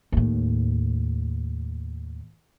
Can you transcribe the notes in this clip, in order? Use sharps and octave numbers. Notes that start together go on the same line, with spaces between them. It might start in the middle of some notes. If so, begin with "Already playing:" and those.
D#2 A2